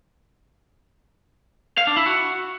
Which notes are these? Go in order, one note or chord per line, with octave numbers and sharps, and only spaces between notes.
F5
D4
E4
F#4